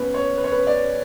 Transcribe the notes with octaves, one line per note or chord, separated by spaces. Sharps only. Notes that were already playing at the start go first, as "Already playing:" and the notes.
Already playing: B3 C#4 B4
C#5
B4
C#5
B4
D5